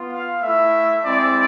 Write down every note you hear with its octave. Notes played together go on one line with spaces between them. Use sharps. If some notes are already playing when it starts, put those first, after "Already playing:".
Already playing: B3 F4
F5
A3 E4 E5
G#3 C4 E4 D5